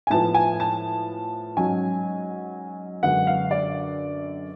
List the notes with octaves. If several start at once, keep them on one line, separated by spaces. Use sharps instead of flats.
G#5
A2 F3 B3 A5
G#5
A5
G#2 F#3 C#4 G#5
F#2 D3 G#3 B3 F#5
F5
D5